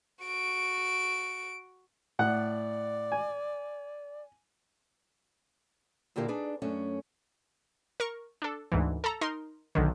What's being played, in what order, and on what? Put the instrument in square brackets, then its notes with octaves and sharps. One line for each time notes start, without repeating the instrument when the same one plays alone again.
[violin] F#4 D7
[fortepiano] A2 F#5 F#6 [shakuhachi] D5
[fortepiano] G#5
[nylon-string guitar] A#2 D3 E4 G4 A#4 F5
D4 D#4 G#4 B4 D5
F#2 A3 C#4 D4
[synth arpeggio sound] A#4 C#6
D4 A4
D2 G#2 E3
A4 A5 A#5
D#4 A#4 C6
B1 D3 D#3